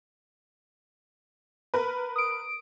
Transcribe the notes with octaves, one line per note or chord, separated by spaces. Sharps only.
A#4 B4
D#6 D7